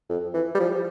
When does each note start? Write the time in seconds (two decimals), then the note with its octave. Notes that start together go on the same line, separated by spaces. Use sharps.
0.09 F2
0.34 E3
0.55 G3
0.60 F3